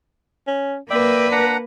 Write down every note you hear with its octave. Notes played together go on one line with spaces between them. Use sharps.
C#4
A#3 B4 D5 E5 G5
D4 F#5 A#5